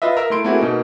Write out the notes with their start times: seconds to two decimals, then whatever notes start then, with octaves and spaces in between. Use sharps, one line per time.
0.02 F4 B4 D#5 E5
0.17 A#4 E5 A#5 E6
0.30 A3 E4 C6 D7
0.44 A3 A#3 C4 E4 F#4 G#4
0.60 B2 A#3 D#4